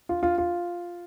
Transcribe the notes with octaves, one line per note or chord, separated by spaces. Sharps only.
F4
F4
F4